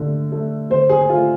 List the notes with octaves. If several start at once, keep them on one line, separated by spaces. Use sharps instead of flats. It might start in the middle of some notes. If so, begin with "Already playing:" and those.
Already playing: D3 A3
A3
D3 C5
G#4
G#4
A3 F4